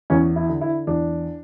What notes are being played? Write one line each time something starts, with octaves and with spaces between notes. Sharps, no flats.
E2 C#4
E4
D3
E4
E2 D4